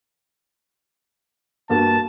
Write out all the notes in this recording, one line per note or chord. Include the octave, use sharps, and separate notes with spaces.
G2 A#3 F#4 A5